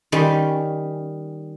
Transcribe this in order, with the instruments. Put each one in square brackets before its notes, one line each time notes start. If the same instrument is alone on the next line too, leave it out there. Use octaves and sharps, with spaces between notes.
[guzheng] D#3 G3 C#4